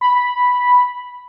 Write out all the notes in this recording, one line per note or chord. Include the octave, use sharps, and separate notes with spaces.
B5